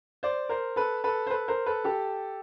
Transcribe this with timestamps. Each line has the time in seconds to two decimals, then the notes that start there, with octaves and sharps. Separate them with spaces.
0.23 C5 D5
0.49 A#4 C5
0.76 A4 B4
1.04 A4 B4
1.27 C5
1.31 A4 B4
1.48 A#4 C5
1.66 A4 B4
1.84 G4 A4